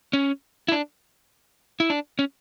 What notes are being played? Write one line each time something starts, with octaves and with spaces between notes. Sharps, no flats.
C#4
E4
D4
E4
D4
C#4